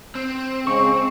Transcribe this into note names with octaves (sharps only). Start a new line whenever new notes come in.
C4
C#3 G#3 C#6